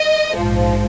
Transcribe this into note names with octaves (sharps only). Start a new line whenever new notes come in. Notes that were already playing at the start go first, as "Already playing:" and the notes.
Already playing: D#5
A#1 G#2 F3